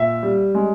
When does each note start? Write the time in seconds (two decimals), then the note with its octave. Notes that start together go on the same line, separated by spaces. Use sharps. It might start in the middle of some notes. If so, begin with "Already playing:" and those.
Already playing: A#2 E5
0.23 G3
0.55 G#3